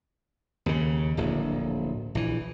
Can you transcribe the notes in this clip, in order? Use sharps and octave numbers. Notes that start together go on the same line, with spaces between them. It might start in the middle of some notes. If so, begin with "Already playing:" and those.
D#2 C#3
D1 A#1
A#1 E3